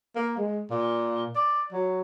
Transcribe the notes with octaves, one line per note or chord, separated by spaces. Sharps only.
A#3
G#3
A#2
D5
F#3